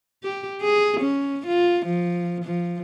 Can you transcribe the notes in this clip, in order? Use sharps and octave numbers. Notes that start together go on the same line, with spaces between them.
G4
G#4
C#4
F4
F3
F3